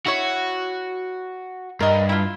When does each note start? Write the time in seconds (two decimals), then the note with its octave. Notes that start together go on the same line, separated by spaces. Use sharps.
0.06 E4 F#4 C#5
1.80 G2 A#4 D#5
2.09 E4 F4